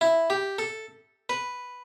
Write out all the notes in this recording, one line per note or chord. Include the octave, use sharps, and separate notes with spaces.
E4
G4
A4
B4